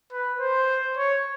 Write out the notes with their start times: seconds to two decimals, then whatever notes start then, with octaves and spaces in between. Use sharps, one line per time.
0.13 B4
0.40 C5
0.98 C#5